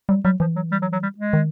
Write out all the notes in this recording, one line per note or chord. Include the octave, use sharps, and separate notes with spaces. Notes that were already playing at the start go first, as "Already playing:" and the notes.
F#3 G3
F#3 G3
E3 F3
F#3
G3
F#3
F#3
G3
G#3
D#3